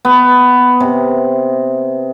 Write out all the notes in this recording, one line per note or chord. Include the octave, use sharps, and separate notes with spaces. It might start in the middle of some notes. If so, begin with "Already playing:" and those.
B3
C3